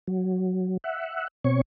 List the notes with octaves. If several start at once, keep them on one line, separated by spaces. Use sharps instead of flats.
F#3
E5 F#5
B2 C4 C#5 C#6